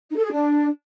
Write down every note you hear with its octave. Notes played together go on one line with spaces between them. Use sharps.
D#4
A4
G#4
D4